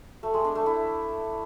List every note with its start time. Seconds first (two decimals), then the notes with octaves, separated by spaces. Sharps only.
0.23 A3
0.34 G#3
0.45 D4
0.55 A3
0.66 E4